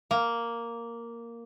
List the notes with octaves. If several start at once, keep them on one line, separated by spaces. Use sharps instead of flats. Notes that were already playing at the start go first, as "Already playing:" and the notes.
A#3